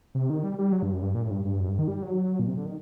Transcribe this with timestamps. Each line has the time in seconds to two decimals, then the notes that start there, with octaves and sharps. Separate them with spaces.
0.15 C3
0.30 D#3
0.43 G3
0.59 G3
0.72 F#3
0.83 G2
0.92 F#2
1.02 G2
1.14 A#2
1.22 A2
1.31 G2
1.45 G2
1.60 F#2
1.69 G2
1.79 D#3
1.88 G3
2.02 F#3
2.40 A#2
2.48 C3
2.57 D3
2.66 D#3